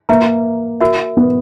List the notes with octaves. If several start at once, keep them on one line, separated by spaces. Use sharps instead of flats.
A#3 B4 E5 A#5
F#4 A#4 E5
B3